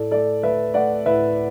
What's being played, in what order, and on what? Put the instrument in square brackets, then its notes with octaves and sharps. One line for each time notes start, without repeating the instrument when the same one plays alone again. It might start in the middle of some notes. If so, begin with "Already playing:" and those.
Already playing: [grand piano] A2 A4 D5
A3 A4 D5
A3 B4 E5
A3 D5 F#5
A2 B4 E5